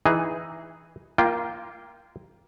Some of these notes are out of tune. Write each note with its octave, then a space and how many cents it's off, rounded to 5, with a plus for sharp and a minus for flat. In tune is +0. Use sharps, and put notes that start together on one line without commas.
E3 +0 D#4 +0 G#4 +0
A#3 +10 F4 -20 G5 +0